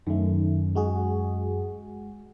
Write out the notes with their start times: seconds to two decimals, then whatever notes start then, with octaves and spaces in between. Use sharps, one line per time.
0.07 F#2 D#3 A3
0.75 G#3 F#4 G#4